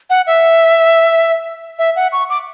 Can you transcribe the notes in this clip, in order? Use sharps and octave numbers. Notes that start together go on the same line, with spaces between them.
F#5
E5
E5
F#5
C#6
D6